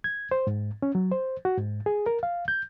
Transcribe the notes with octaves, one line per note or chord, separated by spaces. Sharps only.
G#6
C5
G#2
C#4
F#3
C5
F#4
G#2
G#4
A#4
F5
G6